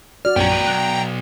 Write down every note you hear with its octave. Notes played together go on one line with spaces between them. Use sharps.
F#4 D5 F6
A#1 F#2 B3 C#4 G5 A#5
D#2 B4
B1 F#6